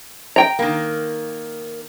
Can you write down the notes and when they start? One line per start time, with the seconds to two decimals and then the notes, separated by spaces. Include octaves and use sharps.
0.36 G5 A#5
0.59 D#3 A#3